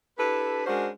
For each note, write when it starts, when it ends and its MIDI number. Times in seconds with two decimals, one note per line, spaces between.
0.18 0.65 62
0.18 0.65 64
0.18 0.65 67
0.18 0.65 69
0.18 0.65 71
0.66 0.88 56
0.66 0.88 61
0.66 0.88 62
0.66 0.88 66
0.66 0.88 70
0.66 0.88 72